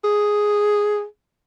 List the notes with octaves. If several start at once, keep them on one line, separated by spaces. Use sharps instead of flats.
G#4